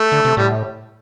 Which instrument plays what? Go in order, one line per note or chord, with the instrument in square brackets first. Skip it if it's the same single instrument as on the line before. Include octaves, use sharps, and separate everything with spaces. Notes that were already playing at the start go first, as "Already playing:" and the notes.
Already playing: [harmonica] A3
[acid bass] D3
C3
[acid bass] A2 [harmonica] G3